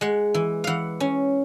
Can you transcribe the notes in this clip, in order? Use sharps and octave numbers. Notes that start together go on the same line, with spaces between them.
G#3 F#5
E3
E3 F5 F#5
C#4